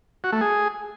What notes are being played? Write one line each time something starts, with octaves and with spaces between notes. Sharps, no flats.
F#4
A3
G#4